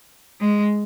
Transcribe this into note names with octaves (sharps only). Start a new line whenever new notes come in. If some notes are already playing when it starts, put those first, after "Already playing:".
G#3